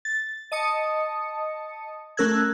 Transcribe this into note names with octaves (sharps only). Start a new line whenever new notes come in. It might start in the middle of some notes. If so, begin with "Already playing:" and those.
A6
D#5 A5 D#6 C#7
A3 C#4 A#4 E6 F#6 G#6